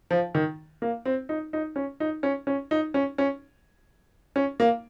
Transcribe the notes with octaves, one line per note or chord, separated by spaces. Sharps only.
F3
D#3
A#3
C4
D#4
D#4
C#4
D#4
C#4
C#4
D#4
C#4
C#4
C#4
A#3